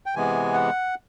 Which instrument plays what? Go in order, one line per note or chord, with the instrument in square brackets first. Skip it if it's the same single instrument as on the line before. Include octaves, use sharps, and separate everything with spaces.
[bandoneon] G5
C3 E3 G#3 B3 G#5
F#5